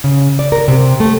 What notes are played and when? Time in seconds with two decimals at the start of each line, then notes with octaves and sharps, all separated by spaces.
0.04 C#3
0.39 D5
0.52 A#4
0.68 C3
1.00 A3